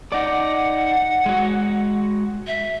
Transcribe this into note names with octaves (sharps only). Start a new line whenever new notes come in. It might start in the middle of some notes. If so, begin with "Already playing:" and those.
D#4 D5 F#5
G#3 F#4
E5